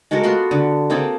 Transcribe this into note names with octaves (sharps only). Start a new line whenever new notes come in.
G#3 F#4 A4 A#4
B3 F4 F#4 C6
D3
A#3 C4 G#4 A4